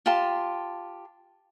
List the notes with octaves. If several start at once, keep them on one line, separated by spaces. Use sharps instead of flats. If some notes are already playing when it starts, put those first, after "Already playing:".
F4 G4 A5 C6